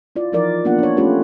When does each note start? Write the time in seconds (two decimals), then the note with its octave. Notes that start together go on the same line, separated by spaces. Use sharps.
0.16 E4 F4 D5
0.32 E3 F3 D#4 E4 A#4 D5
0.65 A#3 B3 D4 F4 F#5
0.79 D4 C#5
0.97 A3 C#4 F4 G4 B4